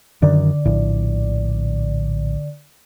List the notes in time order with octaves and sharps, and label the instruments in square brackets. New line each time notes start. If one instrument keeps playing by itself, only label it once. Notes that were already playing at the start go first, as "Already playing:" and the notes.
[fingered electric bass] F#2 D#3 [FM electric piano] D3 D5
[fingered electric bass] A#1 A2